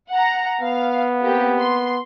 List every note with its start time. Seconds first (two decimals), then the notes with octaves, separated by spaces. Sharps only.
0.11 F#5 A#5
0.61 B3 F5
1.21 A#3 C4 G4
1.59 C6